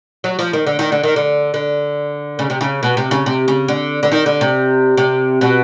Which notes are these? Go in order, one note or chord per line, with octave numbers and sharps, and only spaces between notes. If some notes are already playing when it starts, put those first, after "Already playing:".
F#3
F3
D#3
D3
D#3
D3
D#3
D3
D3
C#3
C3
C#3
B2
C3
C#3
C3
C#3
D3
D3
D#3
D3
C3
C3
B2